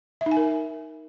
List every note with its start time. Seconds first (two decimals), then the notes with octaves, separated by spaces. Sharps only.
0.21 E5
0.26 D#4
0.31 G#5
0.37 A#4